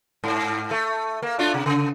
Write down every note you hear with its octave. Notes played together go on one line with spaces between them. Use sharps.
G#2
A3
A#3
A3 D4 F4
C3
C#3